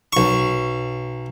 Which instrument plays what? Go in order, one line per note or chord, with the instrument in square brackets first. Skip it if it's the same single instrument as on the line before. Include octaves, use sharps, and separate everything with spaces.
[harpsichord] B1 C#6